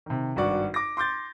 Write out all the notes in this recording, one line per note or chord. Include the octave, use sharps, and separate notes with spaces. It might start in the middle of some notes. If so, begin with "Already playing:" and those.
C3 D#3
G#1 G2 F#4 D5 C#6
D6 A#6
C6 D6 G6 A6